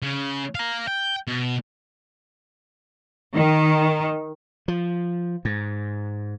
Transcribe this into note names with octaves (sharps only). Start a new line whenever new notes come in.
C#3
F5 A#5
G5
B2
D#3
F3
G#2